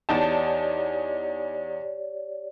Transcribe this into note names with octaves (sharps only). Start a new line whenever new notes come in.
E2 D#4 G4 C#5 D5 A5